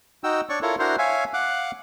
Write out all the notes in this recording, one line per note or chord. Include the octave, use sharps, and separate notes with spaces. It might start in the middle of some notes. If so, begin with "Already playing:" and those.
D#4 F#4 G5 E6
D4 C#5 D5 C#6
E4 F4 A4 A#4 C#5
D4 E4 F#4 A#4 C5 C6
C#5 E5 F5 G#5
F5 F#5 D6 F#6